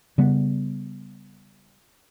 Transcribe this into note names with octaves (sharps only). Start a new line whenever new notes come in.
C#3 G3 B3